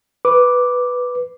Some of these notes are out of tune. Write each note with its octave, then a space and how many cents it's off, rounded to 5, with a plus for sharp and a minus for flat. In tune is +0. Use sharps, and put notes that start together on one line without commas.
B4 +0 D6 +0